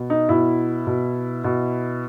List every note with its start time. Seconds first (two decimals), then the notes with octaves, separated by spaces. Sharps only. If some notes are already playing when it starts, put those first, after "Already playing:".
Already playing: B2
0.10 D#4
0.29 B2 E4
0.87 B2
1.44 B2